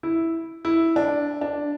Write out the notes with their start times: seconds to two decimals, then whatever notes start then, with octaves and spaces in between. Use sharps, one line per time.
0.03 E4
0.65 E4
0.96 D4
1.41 D4